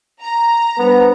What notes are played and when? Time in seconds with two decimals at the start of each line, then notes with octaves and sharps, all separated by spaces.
0.22 A#5
0.78 G3 B3 D4 C5